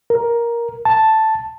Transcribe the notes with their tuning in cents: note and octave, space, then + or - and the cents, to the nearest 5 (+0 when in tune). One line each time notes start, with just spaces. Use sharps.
A#4 +10
A5 +0